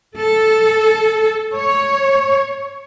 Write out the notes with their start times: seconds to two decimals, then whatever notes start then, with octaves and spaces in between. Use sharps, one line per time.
0.17 A4
1.56 C#5